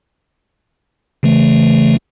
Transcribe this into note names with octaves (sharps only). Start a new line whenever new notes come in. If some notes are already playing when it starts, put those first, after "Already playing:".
C#3 E3 A3